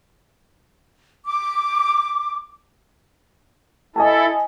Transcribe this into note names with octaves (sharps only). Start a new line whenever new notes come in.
D6
E4 A4 D#5 G#5 A5